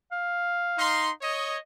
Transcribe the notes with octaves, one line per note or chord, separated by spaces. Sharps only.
F5
D#4 C6
C#5 D#5